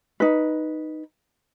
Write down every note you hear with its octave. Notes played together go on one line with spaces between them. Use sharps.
D#4 B4